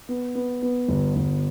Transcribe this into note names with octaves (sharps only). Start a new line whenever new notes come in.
B3
B3
B3
G1
G1